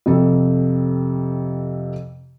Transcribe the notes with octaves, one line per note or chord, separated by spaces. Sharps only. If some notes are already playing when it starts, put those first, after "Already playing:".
F2 C3 A4